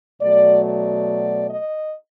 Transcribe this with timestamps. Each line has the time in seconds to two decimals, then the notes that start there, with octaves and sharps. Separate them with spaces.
0.22 B2 F#3 A3 D5
0.65 D5
1.49 D#5